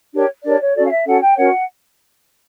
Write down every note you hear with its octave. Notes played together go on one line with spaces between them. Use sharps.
D4 G4 A#4 C#5
D4 G4 A#4 C#5 D5
C#5
C#4 F#4 A4 D5
F5
E5
C#4 F#4 A4 F#5
G5
C#4 F#4 A#4 C#5 F#5